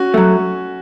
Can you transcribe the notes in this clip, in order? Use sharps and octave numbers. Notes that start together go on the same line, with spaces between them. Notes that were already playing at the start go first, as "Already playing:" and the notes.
Already playing: C#4 F#4
F#3 A3